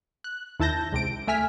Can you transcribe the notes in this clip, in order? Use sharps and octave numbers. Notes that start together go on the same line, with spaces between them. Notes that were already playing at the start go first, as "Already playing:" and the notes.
F#6
D#2 E4 A5 G6 A#6
C#2 C3 D7
A3 E5 G#5 F6 B6